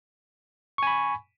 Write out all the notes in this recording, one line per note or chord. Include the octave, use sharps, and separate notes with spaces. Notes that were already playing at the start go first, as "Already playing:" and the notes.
G#5 B5 C#6